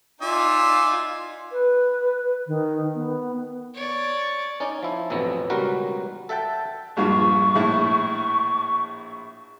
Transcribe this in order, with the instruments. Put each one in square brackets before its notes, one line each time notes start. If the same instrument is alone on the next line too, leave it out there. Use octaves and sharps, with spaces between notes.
[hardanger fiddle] D#4 F4 [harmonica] D5 E5 G#5
[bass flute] B4
D#3
B3
[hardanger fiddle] C#5 D5
[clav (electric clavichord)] C#4 D#4 D5
F3 E4
A1 F2 B2 F#3 B3
C#2 F#3 G3 F#4 A#4 B4
A4 E5 F#5 G5 A5
[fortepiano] A#1 G2 F4 [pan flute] C#6
[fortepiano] A#1 A2 E4